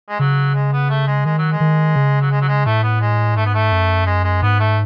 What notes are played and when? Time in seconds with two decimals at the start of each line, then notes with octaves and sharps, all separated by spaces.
0.09 G#3
0.19 C#3 F#3
0.55 G#3
0.73 B3
0.90 A3
1.07 G#3
1.25 D#3 G#3
1.38 F#3
1.52 G#3
1.60 D#3
1.96 C#3
2.21 F#3
2.31 G#3
2.42 F#3
2.48 G#3
2.66 A2 A3
2.83 B3
3.01 G#3
3.37 G#2 A3
3.46 B3
3.55 A3
3.72 F#2
4.07 G#3
4.24 G#3
4.42 G#2 B3
4.60 A3